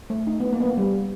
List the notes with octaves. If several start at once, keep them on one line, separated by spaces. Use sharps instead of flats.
A3
D#4
B3
A#3
B3
A#3
G3